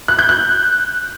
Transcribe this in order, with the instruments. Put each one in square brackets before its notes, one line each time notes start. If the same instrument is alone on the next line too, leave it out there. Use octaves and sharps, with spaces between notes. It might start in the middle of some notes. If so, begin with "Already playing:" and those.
[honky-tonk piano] F#6
G6
F#6